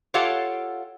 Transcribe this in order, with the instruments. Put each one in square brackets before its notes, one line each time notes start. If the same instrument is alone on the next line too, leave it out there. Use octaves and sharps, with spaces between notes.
[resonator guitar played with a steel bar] F4 G4 A4 C#5 F5 F#5